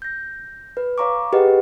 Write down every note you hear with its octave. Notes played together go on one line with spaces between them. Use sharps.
G6 A#6
B4
C#5 F5 A#5 C#6 D6
G4 G#4 B4 D#5 F#5